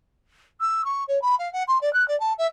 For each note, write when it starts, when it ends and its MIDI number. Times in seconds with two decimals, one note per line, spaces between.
0.60 0.82 88
0.84 1.03 85
1.08 1.21 73
1.21 1.35 83
1.39 1.51 77
1.53 1.63 78
1.67 1.78 84
1.81 1.92 74
1.93 2.06 90
2.08 2.18 74
2.20 2.33 81
2.38 2.46 76